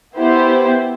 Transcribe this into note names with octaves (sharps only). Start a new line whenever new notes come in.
B3 E4 G4 C5